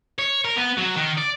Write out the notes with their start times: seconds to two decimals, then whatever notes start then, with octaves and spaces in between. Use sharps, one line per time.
0.19 C#5
0.45 A#4
0.56 B3
0.77 F#3
0.96 D#3
1.17 D5